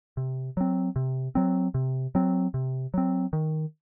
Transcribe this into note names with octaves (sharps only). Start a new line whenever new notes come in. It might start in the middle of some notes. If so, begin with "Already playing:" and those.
C3
F#3 C4
C3
F#3 C4
C3
F#3 C4
C3
F#3 C4
D#3